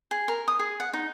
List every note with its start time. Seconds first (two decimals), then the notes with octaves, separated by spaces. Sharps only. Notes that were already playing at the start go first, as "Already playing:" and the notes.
0.11 G#4
0.28 A#4
0.48 D#6
0.59 G#4
0.80 F#5
0.93 D#4